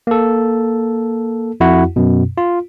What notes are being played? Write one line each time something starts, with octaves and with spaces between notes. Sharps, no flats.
A#3 A4
F2 E4 F#4 F#5
F#2 B2
F4